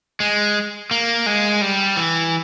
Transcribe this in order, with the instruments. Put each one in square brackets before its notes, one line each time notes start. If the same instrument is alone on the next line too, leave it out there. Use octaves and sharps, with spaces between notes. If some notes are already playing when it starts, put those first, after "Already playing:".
[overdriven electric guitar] G#3
A#3
G#3
G3
E3